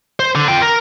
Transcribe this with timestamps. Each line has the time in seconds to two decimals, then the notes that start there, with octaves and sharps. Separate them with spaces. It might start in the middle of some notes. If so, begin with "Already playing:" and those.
0.20 C5
0.35 D3
0.48 F4 G5
0.62 A#4